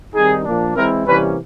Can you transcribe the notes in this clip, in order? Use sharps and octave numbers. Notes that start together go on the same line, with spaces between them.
D#3 G3 C4 D#4 G#4
A#2 F3 A#3 D4
E3 G#3 C4 E4 A#4
C3 E3 G3 A#3 C#4 B4